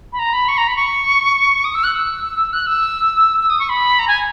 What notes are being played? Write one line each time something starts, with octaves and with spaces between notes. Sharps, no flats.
B5
A#5
B5
C#6
A#5
B5
C#6
D#6
E6
F#6
E6
F#6
E6
E6
D#6
C#6
B5
A#5
G#5